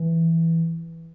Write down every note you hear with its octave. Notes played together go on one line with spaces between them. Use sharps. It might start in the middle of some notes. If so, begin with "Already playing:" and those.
Already playing: E3